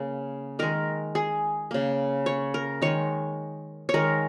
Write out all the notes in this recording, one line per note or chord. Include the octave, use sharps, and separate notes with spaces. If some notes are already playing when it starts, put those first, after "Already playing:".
Already playing: C#3 A#3
D#3 G#3 A#4
G#4
C#3 A#3
C#5
A#4
D#3 G#3 C#5
C#5
D#3 G#3 A#4